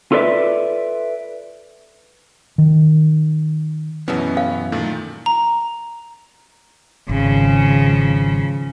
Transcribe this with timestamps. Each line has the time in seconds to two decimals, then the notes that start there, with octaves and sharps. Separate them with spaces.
0.12 F4 A4 B4 D5 E5
2.58 D#3
4.08 F#2 B2 E3 B3 C#4
4.37 F5
4.72 A#2 D#3 A3
5.26 A#5
7.09 G#1 C#3 F3